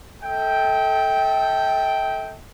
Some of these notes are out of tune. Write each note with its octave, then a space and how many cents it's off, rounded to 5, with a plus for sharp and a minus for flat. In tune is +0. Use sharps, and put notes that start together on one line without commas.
A4 +0 E5 -45 G5 +0